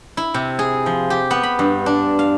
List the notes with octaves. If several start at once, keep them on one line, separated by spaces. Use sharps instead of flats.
E4
C3
G#4
F3
G4
B3
B5
G2
D4
F5